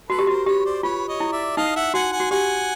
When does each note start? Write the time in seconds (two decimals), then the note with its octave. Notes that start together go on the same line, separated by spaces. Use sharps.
0.09 F#4 A4 B4
0.19 G4
0.27 F#4 A#4 C5
0.46 G4 B4 C#5
0.65 C5 D5
0.83 F4 B4 C#5
1.08 C#5 D#5
1.20 E4
1.32 D5 E5
1.57 D#4 D#5 F5
1.76 E5 F#5
1.94 F#4 F#5 G#5
2.12 F#5 G#5
2.20 F#4
2.31 G4 F#5 G#5